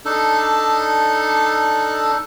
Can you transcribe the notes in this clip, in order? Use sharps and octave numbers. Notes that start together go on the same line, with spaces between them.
D4 D#4 A4